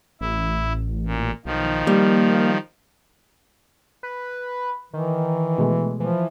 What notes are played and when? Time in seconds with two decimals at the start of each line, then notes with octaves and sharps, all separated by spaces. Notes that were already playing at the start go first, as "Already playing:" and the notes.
0.21 A1 E4
1.06 A#2
1.45 B1 D#3 F3
1.87 G3 A#3
4.03 B4
4.93 D#3 E3
5.58 B2 G#3 A3
6.00 E3 F3